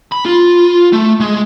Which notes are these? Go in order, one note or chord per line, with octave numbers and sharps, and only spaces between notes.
B5
F4
A3
G#3